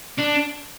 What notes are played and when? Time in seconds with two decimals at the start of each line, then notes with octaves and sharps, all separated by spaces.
0.19 D4